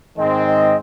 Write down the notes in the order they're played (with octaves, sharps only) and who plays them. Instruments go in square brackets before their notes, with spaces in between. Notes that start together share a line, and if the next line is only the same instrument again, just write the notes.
[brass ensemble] G#2 D#3 G#3 C4 [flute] D#5
[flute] D#5